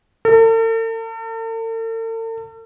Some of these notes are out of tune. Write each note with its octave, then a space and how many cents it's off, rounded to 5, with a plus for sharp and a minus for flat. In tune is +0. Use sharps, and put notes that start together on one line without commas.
A4 +45